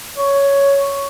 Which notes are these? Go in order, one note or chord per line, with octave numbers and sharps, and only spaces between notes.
C#5